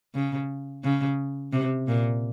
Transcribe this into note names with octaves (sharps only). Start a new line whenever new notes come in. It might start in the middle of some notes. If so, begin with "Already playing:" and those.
C#3
C#3
C3
A#2